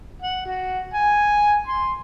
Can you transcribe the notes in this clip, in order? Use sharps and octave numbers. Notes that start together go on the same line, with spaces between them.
F#5
F#4
G#5
C6